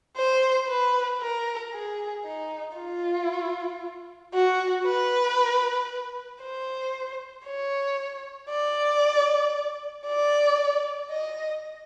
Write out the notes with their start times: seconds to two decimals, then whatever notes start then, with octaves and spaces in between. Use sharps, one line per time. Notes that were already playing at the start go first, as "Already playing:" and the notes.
0.17 C5
0.68 B4
1.21 A#4
1.73 G#4
2.25 D#4
2.77 F4
4.34 F#4
4.85 B4
6.42 C5
7.46 C#5
8.49 D5
10.07 D5
11.10 D#5